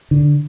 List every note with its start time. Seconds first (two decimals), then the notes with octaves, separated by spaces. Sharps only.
0.11 D3